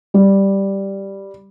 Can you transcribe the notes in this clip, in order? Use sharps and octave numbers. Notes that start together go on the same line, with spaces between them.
G3